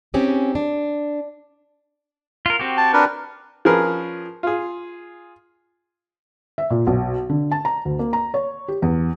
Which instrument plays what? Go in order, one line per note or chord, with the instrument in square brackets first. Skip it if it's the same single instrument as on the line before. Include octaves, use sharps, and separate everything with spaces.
[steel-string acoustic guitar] C4 C#4 D#4 G4 G#4
D4
[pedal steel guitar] F4 A#4
C4 F#4 G4
[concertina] A5
D4 A#4 B4
[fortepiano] F3 C#4 G#4 A#4 B4
F4 G#4
[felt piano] E5
A#2
B1
D3
A5
A#5
D2
A#3
A#5
C#5
G4
E2